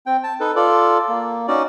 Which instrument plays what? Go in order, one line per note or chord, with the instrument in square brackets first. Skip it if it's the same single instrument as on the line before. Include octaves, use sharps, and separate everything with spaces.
[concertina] C4 G5
A5
D#4 A4 B4
F4 A4 D5
A#3
C#4 D#4 F#4 D5